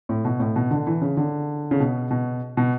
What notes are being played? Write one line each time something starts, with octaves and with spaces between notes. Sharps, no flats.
A2
B2
A2
B2
D3
E3
C#3
D3
C#3
B2
B2
B2